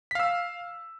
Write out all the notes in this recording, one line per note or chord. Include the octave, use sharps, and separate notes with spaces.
F5 E6 B6